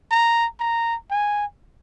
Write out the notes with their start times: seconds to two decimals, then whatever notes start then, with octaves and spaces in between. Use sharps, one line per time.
0.11 A#5
0.60 A#5
1.11 G#5